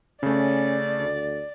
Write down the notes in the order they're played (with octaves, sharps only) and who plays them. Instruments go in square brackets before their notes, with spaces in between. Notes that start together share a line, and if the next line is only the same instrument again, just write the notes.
[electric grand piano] C#3 A3 [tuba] C#4 [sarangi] D5
[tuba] D2